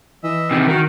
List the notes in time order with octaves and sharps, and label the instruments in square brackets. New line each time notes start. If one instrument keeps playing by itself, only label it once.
[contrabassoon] E3 [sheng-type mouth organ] D#5 E5 E6
[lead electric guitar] C3 D#3
[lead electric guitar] D#3 [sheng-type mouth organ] F#4 A#4